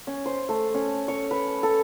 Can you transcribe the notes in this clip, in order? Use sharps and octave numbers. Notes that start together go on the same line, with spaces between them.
C#4
C5
A3
C#4
C#5
B4
A4